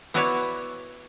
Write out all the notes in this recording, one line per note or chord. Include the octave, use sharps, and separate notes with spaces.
B3 E4 F#4 B4 C#5 D5